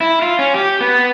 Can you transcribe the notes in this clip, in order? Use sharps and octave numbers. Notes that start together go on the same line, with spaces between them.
E4
F4
C#4
G4
B3